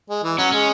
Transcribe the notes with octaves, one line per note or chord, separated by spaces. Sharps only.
G#3
E3
F#3 C#4
G#3 C#4